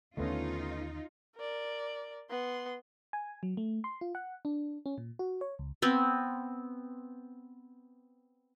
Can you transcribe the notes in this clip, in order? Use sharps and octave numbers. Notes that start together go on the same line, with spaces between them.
D#2 D3 A3 B3 C#4 D#4 F4
A#4 D5
B3 C6
G#5
F#3
A3
C6
F4
F#5
D4
C#4
A#2
F#4
C#5
C#2
B3 C4